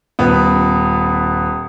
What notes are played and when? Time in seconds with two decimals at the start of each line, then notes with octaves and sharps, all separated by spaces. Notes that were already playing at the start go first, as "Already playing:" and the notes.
0.19 D#1 B3